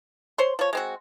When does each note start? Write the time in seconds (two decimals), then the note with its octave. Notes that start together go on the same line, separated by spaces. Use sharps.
0.38 C5 C#5 C6
0.59 F3 C#5
0.73 G#3 C4 F#4